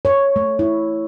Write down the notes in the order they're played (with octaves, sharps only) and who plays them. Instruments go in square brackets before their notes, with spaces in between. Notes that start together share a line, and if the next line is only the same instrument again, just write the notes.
[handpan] C#5
A3
E4